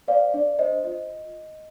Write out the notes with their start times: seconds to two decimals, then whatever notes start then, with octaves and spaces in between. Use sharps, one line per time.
0.08 C5 D5 F5
0.34 D4 D5
0.59 C5 D#5
0.84 F4 D#5